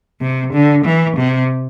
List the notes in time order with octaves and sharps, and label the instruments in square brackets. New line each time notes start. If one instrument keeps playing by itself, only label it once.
[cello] C3
D3
E3
C3